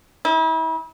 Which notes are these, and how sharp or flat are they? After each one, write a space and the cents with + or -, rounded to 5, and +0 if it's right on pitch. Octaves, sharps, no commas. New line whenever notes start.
E4 -40